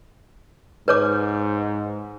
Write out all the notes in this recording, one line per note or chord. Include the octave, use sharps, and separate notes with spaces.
G#2 B4 C#5 D6